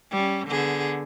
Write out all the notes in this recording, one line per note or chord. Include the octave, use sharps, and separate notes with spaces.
G3 C#4
D3 B3 G#4